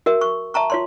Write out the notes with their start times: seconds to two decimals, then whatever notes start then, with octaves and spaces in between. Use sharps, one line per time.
0.06 F#4 A#4 E5
0.21 C#6
0.54 E5 A5 A#5 C#6
0.70 F4 C#5 C6